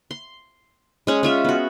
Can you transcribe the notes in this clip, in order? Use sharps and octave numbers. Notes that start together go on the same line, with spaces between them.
C6
G#3 C#4 G#4
C#4 F4 E5
B3 F#4